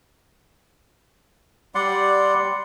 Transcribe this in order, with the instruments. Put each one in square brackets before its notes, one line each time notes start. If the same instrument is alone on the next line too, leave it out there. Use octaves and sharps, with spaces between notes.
[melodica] G3 D5 F#5 C6